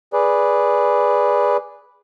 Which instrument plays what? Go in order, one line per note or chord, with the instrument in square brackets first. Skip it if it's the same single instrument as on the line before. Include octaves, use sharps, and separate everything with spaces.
[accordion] G#4 B4 D5